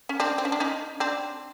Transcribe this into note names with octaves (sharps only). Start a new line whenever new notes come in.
C#4
C4 D4
C4
C#4
D4
C#4 D#4
C4 D4